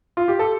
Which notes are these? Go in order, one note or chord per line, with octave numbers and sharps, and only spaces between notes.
F4
G4
A4